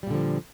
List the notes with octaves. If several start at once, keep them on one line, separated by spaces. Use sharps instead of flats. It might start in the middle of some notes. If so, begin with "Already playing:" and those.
A#2 D3 F3 G3